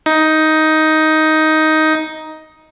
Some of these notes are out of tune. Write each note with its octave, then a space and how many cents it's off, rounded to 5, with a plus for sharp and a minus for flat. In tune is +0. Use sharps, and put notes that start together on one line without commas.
D#4 +10